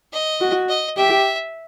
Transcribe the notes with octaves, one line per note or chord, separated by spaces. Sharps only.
D#5
F#4
D#5
G4 E5